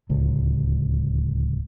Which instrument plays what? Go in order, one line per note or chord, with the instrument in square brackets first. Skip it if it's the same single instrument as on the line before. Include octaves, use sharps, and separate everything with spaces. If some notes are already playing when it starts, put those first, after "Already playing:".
[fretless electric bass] D1 C#2